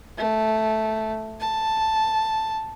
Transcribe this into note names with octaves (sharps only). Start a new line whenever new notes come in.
A3
A5